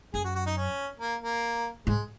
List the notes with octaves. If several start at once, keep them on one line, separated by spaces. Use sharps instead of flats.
F#2 G#4
F#4
F#4
D#4
C#4
A#3
A#3
G#2 G#3